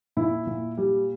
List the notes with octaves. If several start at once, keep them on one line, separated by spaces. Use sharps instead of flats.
A#2 E4
A#2
G3